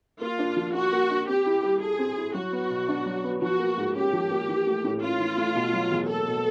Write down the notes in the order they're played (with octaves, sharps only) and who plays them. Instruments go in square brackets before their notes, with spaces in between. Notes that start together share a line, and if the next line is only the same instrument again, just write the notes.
[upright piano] A#3 [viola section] F4
[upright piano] D4
F3
[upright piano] F4 [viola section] F#4
[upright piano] A#3
D4
[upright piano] C4 [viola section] G4
[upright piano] E4
G3
[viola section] G#4 [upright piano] A4
[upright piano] C4
E4
[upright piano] F#3 [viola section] F#4
[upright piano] B3
B2
D4
F#3
B3
[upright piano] F3 [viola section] F#4
[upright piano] A#3
G#2
[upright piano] C#4 [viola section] G4
[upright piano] F3
A#3
E3
A3
A2
[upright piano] C#4 [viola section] F4
[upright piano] E3
A3
B2
F#3
E2
[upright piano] A#3 [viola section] A4
[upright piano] B2